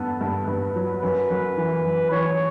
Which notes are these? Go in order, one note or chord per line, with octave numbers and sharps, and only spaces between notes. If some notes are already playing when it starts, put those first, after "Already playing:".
Already playing: G2 B3 A4
G2
G2 B4
F#3
F#2 B4
F#2
E3
F#2
E3 C#5